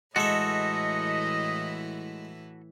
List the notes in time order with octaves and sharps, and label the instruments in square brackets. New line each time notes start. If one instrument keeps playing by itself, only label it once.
[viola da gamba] A2 E3 E4 [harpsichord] G#3 E5 [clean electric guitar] F#4 A4 [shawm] D#5